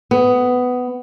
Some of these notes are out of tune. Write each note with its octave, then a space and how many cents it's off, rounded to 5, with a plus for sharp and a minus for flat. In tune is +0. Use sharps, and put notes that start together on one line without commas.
B3 +15